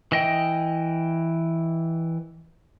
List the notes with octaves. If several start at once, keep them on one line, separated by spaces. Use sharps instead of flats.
E3 D#5 G5